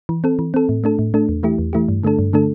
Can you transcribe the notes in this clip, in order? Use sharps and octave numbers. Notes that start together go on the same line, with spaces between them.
E3
C4 A4
E3
C4 A4
A2
A3 D4 A4
A2
A3 D4 A4
E2
E3 A3 E4 G4
E2
E3 A3 E4 G4
G2
D3 A3 D4 A4
G2
D3 A3 D4 A4